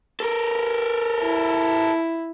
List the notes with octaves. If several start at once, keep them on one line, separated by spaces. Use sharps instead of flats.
A4 A#4
E4